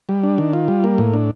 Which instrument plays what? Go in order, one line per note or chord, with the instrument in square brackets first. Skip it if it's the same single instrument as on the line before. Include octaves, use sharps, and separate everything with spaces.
[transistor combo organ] G3
D4
D#3
F4
G3
A#3
A2
D4